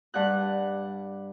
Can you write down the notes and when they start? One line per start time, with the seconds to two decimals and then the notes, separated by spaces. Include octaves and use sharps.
0.14 G2 F#5 F#6